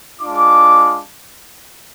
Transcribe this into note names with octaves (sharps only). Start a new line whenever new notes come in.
G#3 D4 F4 D6